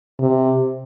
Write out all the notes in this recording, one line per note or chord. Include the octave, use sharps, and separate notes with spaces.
C3